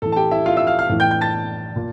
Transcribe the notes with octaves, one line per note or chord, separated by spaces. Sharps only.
A2 E3 A4 A5
A5
G4 G5
E4 E5
F4 F5
E5 E6
F5 F6
F5 F6
A2 E3
G5 G6
G5 G6
A5 A6
A#2